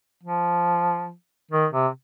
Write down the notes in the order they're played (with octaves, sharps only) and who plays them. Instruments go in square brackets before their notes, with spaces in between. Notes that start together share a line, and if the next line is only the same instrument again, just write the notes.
[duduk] F3
D#3
C3